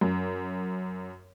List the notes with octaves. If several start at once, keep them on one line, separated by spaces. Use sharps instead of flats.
F#2